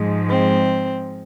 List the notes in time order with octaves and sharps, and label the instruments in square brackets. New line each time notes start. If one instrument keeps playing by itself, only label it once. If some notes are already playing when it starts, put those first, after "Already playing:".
Already playing: [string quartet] G#2 F3 G#3
C4